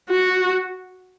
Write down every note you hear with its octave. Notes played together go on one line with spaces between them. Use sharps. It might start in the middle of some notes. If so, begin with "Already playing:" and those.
F#4